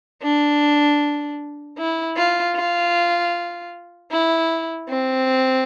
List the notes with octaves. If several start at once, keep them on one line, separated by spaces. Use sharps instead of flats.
D4
E4
F4
F4
E4
C4